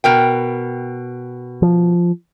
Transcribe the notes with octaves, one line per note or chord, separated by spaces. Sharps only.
B2 A#4 G5
F3